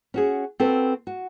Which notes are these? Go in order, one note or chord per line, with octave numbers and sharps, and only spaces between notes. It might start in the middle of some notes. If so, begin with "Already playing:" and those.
C#4 F#4 G#4
C4 F#4 A4 B4
F#4